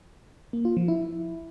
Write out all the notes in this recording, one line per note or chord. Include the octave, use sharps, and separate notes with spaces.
A#3
F4
F3
E4